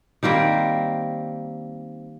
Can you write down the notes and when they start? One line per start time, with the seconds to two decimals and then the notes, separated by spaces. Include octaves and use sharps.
0.23 D#3 G3 A#3 C4